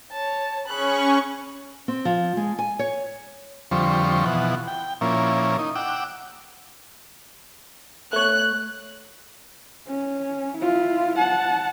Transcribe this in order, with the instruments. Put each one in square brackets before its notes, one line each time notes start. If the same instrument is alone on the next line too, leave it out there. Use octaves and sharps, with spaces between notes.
[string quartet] C#5 A5
[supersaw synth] C#4 C#6 [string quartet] G#4 B5 F#6
[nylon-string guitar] C4
F3
G#3
G#5
C#5
[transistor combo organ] F2 D3 F3 G3 C4 C#6
B2 E3 F3 F#5
G5
A#2 F3 A#3 C#4 E4
D#4
F#5 G5 D6 E6
[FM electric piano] A3 C#5 [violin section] F#6
[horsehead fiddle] C#4
E4 F4
F#5 A5